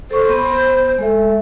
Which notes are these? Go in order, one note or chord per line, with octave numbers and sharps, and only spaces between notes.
A4 C5 C#6
B3
G#3 A4 E5